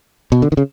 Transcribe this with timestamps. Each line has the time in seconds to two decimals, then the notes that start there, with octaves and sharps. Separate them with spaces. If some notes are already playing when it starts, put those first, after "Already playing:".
0.32 B2
0.42 D3
0.52 D#3
0.57 C#3